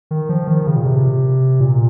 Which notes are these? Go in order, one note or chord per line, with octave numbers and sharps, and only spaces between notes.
D#3
F3
D#3
C#3
A#2
C3
A#2